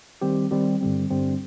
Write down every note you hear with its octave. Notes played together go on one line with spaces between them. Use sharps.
D#3 G3 C4 G4
D#3 G3 C4 G4
G2 D3 G3 C4
G2 D3 G3 C4